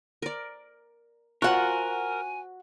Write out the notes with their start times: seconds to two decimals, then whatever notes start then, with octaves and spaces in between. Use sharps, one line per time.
0.22 A#4 D5
1.42 F4 F#4 A#4 C5 F#5 G#5